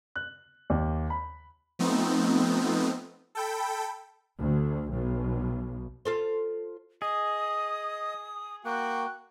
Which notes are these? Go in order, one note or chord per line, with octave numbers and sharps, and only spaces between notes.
F#6
D#2
B5
F3 A3 B3 C4 D#4
A4 G5 B5
D2
B1
F4 A4 C5
G#4 D#5 D#6
A#3 F#4 G5 F#6